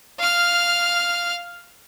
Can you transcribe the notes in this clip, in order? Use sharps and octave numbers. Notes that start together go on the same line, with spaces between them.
F5 F6